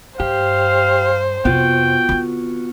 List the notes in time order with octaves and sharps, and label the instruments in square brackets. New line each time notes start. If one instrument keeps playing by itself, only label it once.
[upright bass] G2 [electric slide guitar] G4 [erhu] C5 [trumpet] F5
[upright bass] F2 C3 [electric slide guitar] B3 F4 F#4 [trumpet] G5
[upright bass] D3 C4